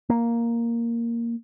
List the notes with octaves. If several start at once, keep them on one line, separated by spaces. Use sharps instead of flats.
A#3